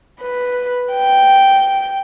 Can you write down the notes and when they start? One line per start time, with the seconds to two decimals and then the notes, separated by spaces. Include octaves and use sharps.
0.21 B4
0.94 G5